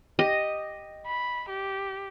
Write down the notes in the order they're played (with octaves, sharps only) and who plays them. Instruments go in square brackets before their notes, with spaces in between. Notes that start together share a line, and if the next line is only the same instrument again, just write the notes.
[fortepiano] G4 [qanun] D#5
[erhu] B5
G4